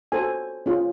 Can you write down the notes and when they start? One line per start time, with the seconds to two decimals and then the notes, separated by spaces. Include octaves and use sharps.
0.12 F#4 A4 C5 G#5
0.66 C#4 F4 G#4